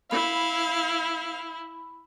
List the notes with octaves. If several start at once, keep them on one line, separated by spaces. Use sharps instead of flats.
E4 F5 B5